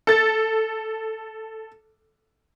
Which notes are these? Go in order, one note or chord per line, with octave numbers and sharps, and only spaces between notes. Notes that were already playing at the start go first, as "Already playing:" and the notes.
A4 A6